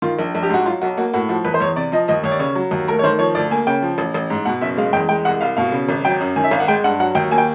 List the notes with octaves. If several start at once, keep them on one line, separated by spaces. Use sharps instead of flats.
D#3 F4
A#1
A#1
G4
G#2 F#4
F#3 F4
B1 F#4
A#3 F#4
A2 F#4
F3 F#4
E2 B4
C5
E2 C#5
C3 D5
F3 D#5
D#2 D#5
D#2 C#5
D5
C#3 C#5
F#3
D#2
A3 A#4
C#5
D#3 C5
F3 C#5
D2 D5
A#3 G#5
C#3 G5
F3
A1
A1
G#2
B2 F#5
F#1 E5
G#3 F5
E2 G5
G#3 G5
C2 F#5
C2 F5
B2 F5
C#3
G#1
F#3 G5
F#2
D#3 G#5
E5
G#1 F5
F#5
G#3 G5
G2 F#5
F#3 F#5
D#2 G5
A#3 G#5
G5